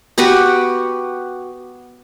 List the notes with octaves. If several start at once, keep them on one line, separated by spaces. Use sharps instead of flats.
B3 F#4 G4 B4